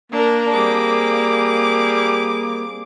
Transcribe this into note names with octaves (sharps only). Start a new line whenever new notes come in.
A#3 D4 A#4
G3 C4 G#4 D6